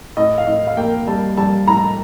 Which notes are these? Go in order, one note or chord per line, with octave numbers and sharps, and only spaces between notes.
A2 D#5
F5
A2 D#5
F5
A#3 G5
G3 A5
G3 A5
A2 A#5